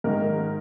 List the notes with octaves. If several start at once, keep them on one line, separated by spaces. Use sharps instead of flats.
G#2 D#3 A#4